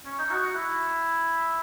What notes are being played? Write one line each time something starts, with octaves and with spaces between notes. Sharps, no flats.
C#4
D#4
F#4
F#4
E4